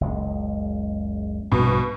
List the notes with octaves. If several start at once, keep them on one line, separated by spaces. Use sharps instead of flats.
F#1 C#2 G#3
A#1 G2 B2